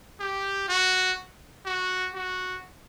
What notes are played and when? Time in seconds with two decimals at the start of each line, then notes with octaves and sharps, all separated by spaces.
0.20 G4
0.69 F#4
1.66 F#4
2.14 F#4